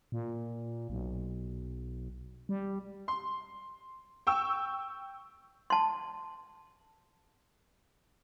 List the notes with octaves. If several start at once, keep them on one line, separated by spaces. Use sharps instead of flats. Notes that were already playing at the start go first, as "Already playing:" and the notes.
A#2
B1
G3
C6
G5 C#6 E6
A5 C6